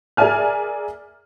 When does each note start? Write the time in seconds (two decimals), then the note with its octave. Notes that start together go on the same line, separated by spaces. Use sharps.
0.17 G#4 A#4 D5 E5 G#5 F6